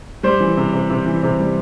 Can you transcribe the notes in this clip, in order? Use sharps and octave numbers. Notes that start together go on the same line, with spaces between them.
G3 C5
E3
C3
C3
C3
E3
C3
G3